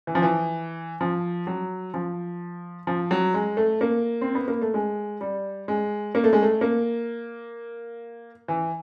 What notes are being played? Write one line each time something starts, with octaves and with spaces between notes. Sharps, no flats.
E3
F3
E3
F3
F#3
F3
F3
F#3
G#3
A3
A#3
C4
B3
A#3
A3
G#3
G3
G#3
A#3
A3
G#3
A3
A#3
E3